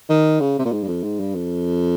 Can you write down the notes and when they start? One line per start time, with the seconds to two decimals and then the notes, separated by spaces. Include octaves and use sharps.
0.09 D#3
0.40 C#3
0.58 C3
0.65 A#2
0.72 G#2
0.83 G2
0.87 F2
1.03 G#2
1.20 G2
1.35 F2